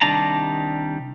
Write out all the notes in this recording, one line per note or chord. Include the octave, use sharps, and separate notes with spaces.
C2 D#3 G3 D4 A5 A#5